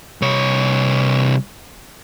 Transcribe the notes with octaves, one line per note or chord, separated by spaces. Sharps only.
C2 C#5